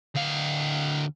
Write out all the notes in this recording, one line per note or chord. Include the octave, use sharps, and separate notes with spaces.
D2 F5